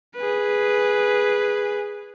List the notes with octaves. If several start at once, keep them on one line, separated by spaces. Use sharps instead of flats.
G#4 B4